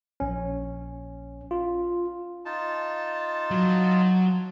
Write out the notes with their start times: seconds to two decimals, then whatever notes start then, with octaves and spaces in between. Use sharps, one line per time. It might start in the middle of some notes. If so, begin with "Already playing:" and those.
0.20 A#1 C#4
1.51 F4
2.45 D#4 F4 A5
3.51 F#3